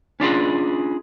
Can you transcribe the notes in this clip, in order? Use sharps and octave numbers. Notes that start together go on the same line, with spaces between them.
C#4 D4 F4 G#4